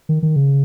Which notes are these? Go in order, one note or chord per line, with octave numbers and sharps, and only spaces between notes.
D#3
D#3
C#3